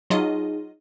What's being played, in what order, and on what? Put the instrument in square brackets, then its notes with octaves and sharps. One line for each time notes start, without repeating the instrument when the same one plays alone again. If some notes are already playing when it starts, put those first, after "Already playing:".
[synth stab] F#3 F4 D#5 [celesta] D#4 G#4